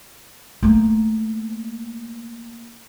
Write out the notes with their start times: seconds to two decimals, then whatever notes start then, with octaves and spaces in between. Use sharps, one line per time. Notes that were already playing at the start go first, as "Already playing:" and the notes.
0.63 A3 A#3